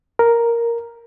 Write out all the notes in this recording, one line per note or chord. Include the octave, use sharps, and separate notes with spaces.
A#4